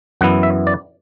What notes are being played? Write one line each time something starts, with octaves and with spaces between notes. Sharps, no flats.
F#2 E3 B3 E4 F#5
E5
D5